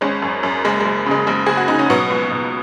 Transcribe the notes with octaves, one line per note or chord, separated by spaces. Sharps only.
G#1 G#3 C#4
F#2
F#2
F#1 G#3
F#1 G#3
C#3 G#3
F#1 G#3
F#1 G#4
F#4
C#3 D#4
C#4
B2 F#3 B3
C#2
B2